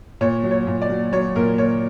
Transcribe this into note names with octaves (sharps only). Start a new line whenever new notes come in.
A#2 C#5
F#3
C#5
A#2
D5
F#3
F#3 C#5
A#2 A#4
A#2 C#5